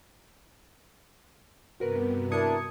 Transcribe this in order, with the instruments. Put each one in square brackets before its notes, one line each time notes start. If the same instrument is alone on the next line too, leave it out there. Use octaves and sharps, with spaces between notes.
[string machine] G2 C3 B3 [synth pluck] F#4 A#4 B4
[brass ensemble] D4 E4 A#4 [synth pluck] D#6 G#6 C#7